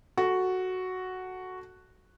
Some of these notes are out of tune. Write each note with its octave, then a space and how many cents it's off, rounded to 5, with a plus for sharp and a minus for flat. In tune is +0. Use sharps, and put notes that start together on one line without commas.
F#4 +0 A4 +0